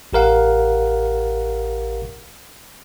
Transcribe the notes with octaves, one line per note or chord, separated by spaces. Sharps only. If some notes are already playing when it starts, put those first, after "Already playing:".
A1 G4 A#4 F5 F#5